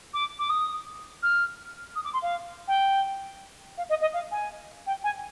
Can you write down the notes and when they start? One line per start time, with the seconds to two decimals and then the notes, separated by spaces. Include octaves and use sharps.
0.14 D6
0.39 D6
0.50 D#6
1.23 F6
1.95 D#6
2.04 D6
2.13 C6
2.22 F5
2.68 G5
3.78 F5
3.89 D#5
4.01 D#5
4.13 F5
4.31 G#5
4.87 G5
5.04 G#5